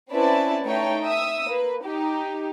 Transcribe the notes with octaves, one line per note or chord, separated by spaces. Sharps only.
C4 C#4 E4 B4 D5 A5
A3 D#4 C#5 G5
E5 D#6 E6
A#3 B4
D#4 G4